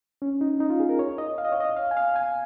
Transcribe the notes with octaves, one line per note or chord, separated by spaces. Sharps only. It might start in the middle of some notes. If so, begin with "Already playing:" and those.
C#4
D#4
D#4
F4
G#4
A#4
C#5
D#5
F5
D#5
C#5
D#5
F5
G#5
F5
G#5